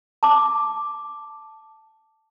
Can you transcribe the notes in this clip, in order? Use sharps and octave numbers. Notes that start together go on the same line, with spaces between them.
A5 D6